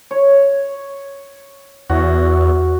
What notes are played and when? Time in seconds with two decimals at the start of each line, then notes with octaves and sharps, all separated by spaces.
0.11 C#5
1.90 E2 F#4